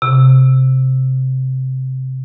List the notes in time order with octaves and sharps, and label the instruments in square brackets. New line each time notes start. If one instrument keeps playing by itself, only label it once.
[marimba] C3